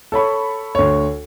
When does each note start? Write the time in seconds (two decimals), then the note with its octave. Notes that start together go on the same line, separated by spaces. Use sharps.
0.12 A4 C#5 B5 C#6
0.75 D2 C#5